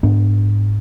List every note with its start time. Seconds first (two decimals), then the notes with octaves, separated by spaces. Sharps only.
0.03 G#2 B3 D4